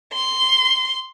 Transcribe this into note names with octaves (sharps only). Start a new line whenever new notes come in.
C6